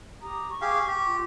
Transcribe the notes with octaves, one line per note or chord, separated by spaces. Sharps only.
G4 A#5 D#6
C#6
G4 G#4 F5
G4
F4